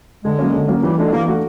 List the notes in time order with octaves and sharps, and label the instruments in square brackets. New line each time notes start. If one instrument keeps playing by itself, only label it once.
[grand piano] D3 [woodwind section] G#3
[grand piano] F#3 A#3 C#4
D3
F#3 A#3 C#4
[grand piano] E3 [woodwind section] G3
[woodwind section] G#3 [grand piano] A3 D4 F#4
[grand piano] E3 [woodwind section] A#3
[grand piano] A3 D4 F#4